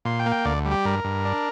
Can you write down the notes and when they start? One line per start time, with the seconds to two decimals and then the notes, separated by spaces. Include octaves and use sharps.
0.05 A#2 C6
0.20 G5
0.26 A#3
0.32 G5
0.45 D2 D5
0.66 G3
0.71 G4
0.85 G2 A#4
1.04 G2
1.25 D4